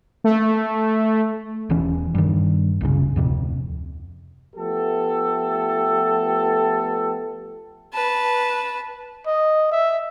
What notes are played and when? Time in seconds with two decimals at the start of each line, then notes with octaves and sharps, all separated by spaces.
0.24 A3
1.70 E1 E2 E3 C#4
2.15 G2 D#3
2.81 F#1 C2 C#3
3.16 D1 F2 C3
4.56 F3 A3 B3 G4 A4
7.93 B4 A5
9.27 D#5
9.72 E5